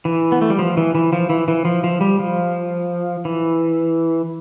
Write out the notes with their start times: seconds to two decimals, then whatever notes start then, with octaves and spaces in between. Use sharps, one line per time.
0.05 E3
0.32 B3
0.42 A3
0.50 G3
0.59 F3
0.77 E3
0.95 E3
1.13 F3
1.30 E3
1.48 E3
1.65 F3
1.84 F3
2.01 G3
2.19 F3
3.25 E3